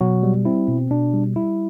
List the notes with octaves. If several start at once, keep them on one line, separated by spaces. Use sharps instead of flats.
B2 F#3 F#4
G3
C4 E4
B2
B2 D4
G3
G3 E4